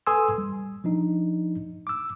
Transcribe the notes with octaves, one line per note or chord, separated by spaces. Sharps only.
A4 B4 G#5 C6 D#6 E6
G3
F3 D4 D#4
D6 E6